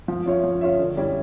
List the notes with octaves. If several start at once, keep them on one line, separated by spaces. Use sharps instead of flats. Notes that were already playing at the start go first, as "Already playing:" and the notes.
F3
C#4 F4 C#5 E5
F3
C#4 F4 C#5 E5
D3
G3 C#4 E4